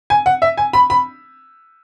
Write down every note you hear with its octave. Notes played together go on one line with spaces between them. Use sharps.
G#5
F#5
E5
G#5
B5
B5